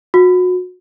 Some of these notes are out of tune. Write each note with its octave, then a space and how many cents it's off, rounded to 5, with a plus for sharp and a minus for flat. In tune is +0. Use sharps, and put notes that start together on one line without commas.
F#4 -30